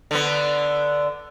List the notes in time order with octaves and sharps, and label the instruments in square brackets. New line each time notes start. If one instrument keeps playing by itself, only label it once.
[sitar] D3 B3